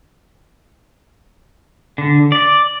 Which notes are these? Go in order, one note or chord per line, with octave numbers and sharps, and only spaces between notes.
D3
D5